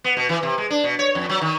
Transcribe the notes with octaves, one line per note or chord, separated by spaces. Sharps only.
B3
B2
E3
C3
G#3
D4
B2
C#5
F2
F#3
D#3